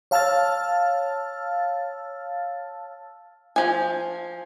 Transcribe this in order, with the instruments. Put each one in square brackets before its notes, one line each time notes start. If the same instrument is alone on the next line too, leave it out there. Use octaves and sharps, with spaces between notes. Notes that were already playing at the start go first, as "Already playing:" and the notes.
[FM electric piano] C#5 F5 A5 E6 F6 A6
[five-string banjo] F3 G#5